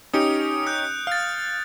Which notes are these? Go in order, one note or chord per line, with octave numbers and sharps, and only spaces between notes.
C#4 D#4 G4 D#6 C#7 D7
D#6 F#6 G6
F5 F6 A6